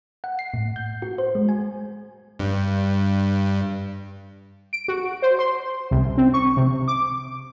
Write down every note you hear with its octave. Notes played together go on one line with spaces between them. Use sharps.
F#5
C7
A2
G6
F#4
C5
G#3
G#5
G2
D7
F#4
C5
C6
C2
C4
C#6
C3
D6